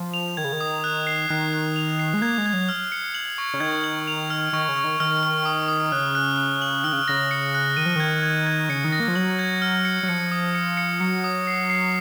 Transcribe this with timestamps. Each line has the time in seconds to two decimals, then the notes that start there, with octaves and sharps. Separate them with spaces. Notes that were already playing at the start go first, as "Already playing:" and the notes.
Already playing: F3
0.14 F7
0.37 D#3 G#6
0.44 C#3
0.53 D#3
0.61 D#6
0.84 F#6
1.07 C7
1.29 D#3 F#6
1.53 F#6
1.76 F7
1.99 C7
2.14 G#3
2.22 A#3 G#6
2.38 G#3
2.46 G#6
2.53 F#3
2.69 F6
2.92 C#7
3.15 F#7
3.38 C#6
3.54 C#3
3.60 D#3 G#6
3.84 F#7
4.07 F7
4.30 F6
4.53 D#3 C#6
4.68 C#3
4.76 C#6
4.84 D#3
5.00 D#3 F6
5.23 F6
5.45 D#6
5.68 D#6
5.92 C#3 F#6
6.15 F#6
6.38 F#6
6.62 F#7
6.84 D#3 F6
6.93 C#3
7.08 C#3 A#6
7.31 C#7
7.55 F#6
7.77 D#3 D#7
7.86 F3
7.96 D#3 G#6
8.23 G#6
8.47 G#6
8.69 C#3 C#7
8.84 D#3
8.92 A#6
9.00 A#3
9.08 F3
9.15 F#3 F#7
9.39 G#6
9.62 F6
9.85 C#7
10.03 F#3
10.08 F3 C#7
10.32 D#6
10.55 C#7
10.77 C#7
11.00 F#3 C#7
11.24 D#6
11.47 C7
11.70 C7